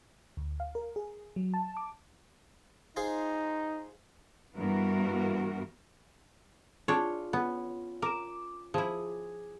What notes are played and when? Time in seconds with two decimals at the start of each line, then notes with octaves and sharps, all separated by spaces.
0.37 D2
0.60 F5
0.75 A#4
0.96 G#4
1.36 F#3
1.54 A5
1.77 D6
2.96 D#4 F4 G#4 C5
4.55 G2 E3 B3 F#4 A#4
6.88 D4 F4 G#4 C#5
7.33 B3 C#4
8.02 A#4 D6 E7
8.74 F3 E4 G#4